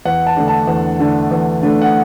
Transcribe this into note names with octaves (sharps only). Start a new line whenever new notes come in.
E2 F#5
A5
D3 A3 D4
A5
E2
D3 A3 D4
E2
D3 A3 D4
F#5